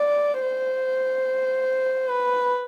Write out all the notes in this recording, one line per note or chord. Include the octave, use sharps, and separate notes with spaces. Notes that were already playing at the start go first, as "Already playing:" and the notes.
Already playing: D5
C5
B4